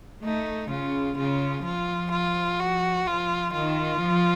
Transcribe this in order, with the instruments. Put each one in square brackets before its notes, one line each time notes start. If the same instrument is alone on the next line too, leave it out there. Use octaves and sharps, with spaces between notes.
[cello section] A3 [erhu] D#4
[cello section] C#3 [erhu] F4
[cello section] C#3 [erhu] F4
[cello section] F3 [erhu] F4
[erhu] F4
F#4
[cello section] F3 [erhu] F4
[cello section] D#3 [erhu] F4
[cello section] F3